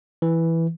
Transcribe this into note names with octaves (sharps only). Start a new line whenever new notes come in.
E3